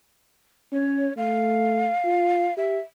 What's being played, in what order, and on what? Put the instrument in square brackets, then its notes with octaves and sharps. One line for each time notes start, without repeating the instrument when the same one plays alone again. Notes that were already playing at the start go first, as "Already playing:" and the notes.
[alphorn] C#4 [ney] C#5
[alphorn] A3 [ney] F5
[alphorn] F4
[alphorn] G4 [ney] E5